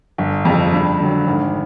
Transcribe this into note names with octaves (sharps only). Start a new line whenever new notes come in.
G1
F2 C#3
G2
D3 F#3
G#1